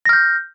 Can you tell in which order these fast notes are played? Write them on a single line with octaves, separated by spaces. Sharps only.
A#6 F6 G6